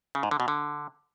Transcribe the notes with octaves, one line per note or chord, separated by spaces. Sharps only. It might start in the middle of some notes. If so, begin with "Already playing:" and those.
C#3
G#2
D3
B2
D3